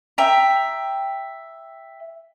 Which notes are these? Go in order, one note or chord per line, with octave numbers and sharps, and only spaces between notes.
E5 G5 A#5